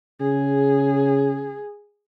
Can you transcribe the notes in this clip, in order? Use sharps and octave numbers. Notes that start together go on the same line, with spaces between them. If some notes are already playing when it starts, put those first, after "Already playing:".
C#3 G#4